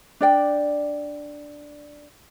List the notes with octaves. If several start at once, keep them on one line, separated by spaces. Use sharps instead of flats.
D4 D5 G5